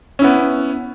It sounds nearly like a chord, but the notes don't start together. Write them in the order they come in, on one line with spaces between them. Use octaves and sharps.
C#4 E4 B3